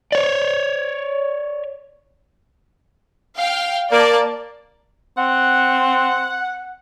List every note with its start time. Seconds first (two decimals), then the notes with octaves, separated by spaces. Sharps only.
0.12 C#5 D5
3.37 F5 G5
3.92 A#3 D5 A5
5.18 C4 F#5